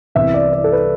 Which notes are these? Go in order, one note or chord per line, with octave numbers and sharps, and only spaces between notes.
C2 C3 E3 B3 E5
D5
D5
A4
B4